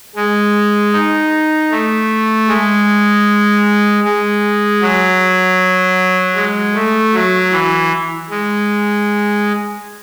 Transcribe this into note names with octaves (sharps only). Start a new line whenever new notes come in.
G#3
D#4
A3
G#3
G#3
F#3
G#3
A3
F#3
E3
G#3